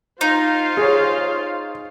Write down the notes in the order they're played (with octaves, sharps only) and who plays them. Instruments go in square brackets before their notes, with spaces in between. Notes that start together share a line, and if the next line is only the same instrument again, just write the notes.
[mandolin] D#4 [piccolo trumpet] F4 [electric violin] C5 F5
[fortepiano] G#4 C#5